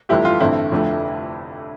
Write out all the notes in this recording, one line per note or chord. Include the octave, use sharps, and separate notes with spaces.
G1 F2 E3 A3 E4 G4
F4
A1 G2 D3 A3 C4 E4
F1 F2 D3 A3